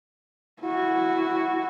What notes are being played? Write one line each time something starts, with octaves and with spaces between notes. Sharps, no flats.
E4 F#4